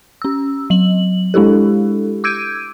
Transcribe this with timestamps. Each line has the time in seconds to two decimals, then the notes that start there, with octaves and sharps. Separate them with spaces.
0.22 C#4 E6
0.70 F#3 F#7
1.34 G#3 D4 E4 G4 A4
2.24 D6 E6 G6 G#6 D7 D#7